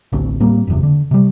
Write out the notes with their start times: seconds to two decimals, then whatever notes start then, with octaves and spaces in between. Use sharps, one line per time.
0.13 A1 D2 C4
0.40 A2 G3 A#3 C4
0.67 F#1 E2 C3
0.83 D3
1.11 C3 G3